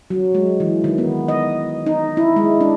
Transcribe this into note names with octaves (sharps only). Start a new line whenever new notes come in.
F#3
G#3
E3
D#3
B3
D#5
D#4
E4
G#3
D4